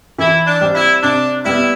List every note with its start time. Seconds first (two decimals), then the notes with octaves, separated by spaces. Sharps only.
0.19 E3 E4
0.47 D4
0.61 G3 C4
0.75 E4
1.03 C3 D4
1.45 G3 B3 E4